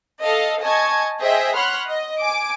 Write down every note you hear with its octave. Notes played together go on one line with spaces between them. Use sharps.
A4 D#5 F5
D#5 G#5 A5 C#6 G#6
G#4 C5 D#5 E5 G5
C#5 F#5 B5 C6 F6 F#6
D#5
G#5 D6 D7